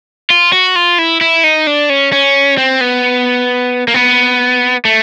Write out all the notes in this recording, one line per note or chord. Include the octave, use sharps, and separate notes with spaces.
F4
F#4
F4
E4
E4
D#4
D4
C#4
C#4
C4
B3
A#3
B3
A3